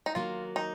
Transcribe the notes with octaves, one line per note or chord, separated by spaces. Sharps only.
D#4
D#3 F#3 A#3 F4
D#4